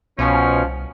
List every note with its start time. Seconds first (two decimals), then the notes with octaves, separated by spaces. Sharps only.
0.19 C2 B2 F3 C#4